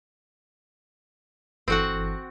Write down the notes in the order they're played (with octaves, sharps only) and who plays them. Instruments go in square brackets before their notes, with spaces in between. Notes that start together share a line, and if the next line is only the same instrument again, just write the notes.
[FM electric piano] G1 E3 A4 [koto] C4 F#4 F#5